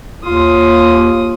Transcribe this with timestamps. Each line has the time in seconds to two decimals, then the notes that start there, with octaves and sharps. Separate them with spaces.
0.23 D#2 F4 D#6